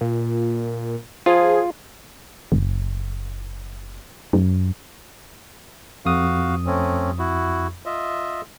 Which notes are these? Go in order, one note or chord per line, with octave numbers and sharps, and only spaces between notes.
A#2
F3 F4 G#4
F#1
F#2
F2 F#4 F5 D#6
A3 C4 C#4
E4 F#4
F4 D#5 E5